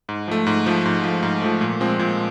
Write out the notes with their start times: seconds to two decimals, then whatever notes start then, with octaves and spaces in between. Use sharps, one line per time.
0.09 G#2
0.28 F3 A3
0.47 G#2
0.66 F3 A3
0.85 G#2
1.04 F3 A3
1.23 G#2
1.42 F3 A3
1.61 A#2
1.80 F3 G#3 C4
1.99 A#2